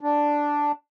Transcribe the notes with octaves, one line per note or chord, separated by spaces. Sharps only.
D4